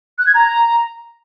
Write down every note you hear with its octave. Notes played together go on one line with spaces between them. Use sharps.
F#6
G#6
A#5